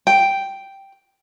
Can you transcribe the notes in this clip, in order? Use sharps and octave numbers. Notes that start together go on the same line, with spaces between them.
G5